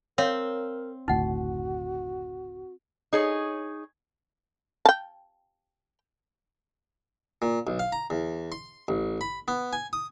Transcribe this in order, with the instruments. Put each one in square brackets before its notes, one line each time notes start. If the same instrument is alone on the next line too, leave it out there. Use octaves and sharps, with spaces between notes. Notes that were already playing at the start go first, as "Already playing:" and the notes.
[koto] C4 [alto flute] A#4 [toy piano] C#5 F5
[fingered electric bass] F#1 D2 A2 [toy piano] D#4 F#5 [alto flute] F#4
[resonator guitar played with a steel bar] D#4 G#4 C#5
[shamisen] G5 A5
[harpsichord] A#2
B1
F5
A#5
E2
C6
A1
B5
B3
G#5
D#6